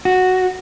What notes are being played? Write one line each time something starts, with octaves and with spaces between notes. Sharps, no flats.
F#4